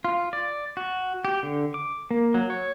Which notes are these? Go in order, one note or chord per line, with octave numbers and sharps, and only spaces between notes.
F4
D5
F#4
G4
D3
D6
A#3
F#3
C#5